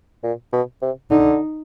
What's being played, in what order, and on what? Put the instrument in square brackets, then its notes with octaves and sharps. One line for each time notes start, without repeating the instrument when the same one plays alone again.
[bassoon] A#2
B2
C3
[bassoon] D3 [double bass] D#4